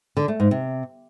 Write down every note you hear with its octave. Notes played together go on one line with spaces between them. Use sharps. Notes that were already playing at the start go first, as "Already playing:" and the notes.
D3
A3
G#2
C3